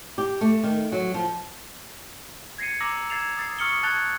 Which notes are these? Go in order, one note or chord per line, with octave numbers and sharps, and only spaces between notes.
G4
A3
D#3
F#3
F3
G#6 A#6 C7 C#7 D#7
A#5 D6 E6 A#6 F#7
E6 G#6 A6 C7 E7 F7
D#6 A6 C7
C#6 D#6 F6 C#7 F#7 G7
A5 F#6 G#6 A6 F7 G7